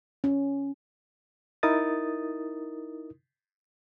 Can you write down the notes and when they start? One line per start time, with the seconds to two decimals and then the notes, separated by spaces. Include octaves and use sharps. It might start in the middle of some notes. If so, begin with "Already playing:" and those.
0.24 C#4
1.63 D#4 E4 A#4 D#6 A6